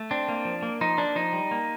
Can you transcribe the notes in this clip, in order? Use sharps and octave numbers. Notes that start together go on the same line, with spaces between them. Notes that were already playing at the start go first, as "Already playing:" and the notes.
Already playing: A3
C4 D4
A#3
F3
A#3
F3 D#4
A#3 D4
F3 D#4
G3
A#3